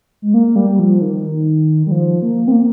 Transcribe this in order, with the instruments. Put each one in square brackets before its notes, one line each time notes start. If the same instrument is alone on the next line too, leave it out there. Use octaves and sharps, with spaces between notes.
[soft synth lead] G#3
A#3
G3
F3
D#3
G3
F3
A#3
C4
A#3